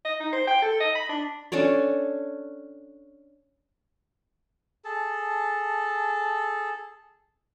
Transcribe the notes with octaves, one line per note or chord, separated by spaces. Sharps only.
D#5
D#4
C5
G5
A4
D#5
B5
D4
C#4 D4 A4 C#5
G#4 A4 A5